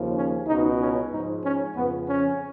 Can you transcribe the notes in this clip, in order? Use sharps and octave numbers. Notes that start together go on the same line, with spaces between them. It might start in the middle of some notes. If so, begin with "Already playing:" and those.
Already playing: D#2 C#3 F3
C#4
C#2 B2 D#4
C#4
G#2 F3 D#4
C#4
F2 C#3 F3 B3
C#4